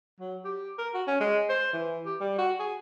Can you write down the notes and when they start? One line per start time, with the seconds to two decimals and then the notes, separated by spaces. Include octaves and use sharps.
0.20 F#3
0.45 G4
0.78 A#4
0.94 F#4
1.07 C#4
1.20 G#3
1.49 C5
1.73 E3
2.06 G4
2.21 G3
2.39 F#4
2.59 G#4